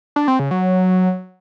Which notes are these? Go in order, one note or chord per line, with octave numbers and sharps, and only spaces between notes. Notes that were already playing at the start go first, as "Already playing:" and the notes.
D4
C4
C#3
F#3